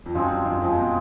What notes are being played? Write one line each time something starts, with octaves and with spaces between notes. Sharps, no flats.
F2
F#2 F3 G#3 C4
G2
F#2
F2 F3 G#3 C4
B2